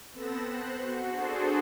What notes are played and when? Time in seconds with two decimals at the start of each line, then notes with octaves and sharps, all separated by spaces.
0.12 B3 C4 A4 B5 A#6 E7
0.42 C5 F#6
0.75 F#4
1.06 D4 F#4 G#4 A4 C5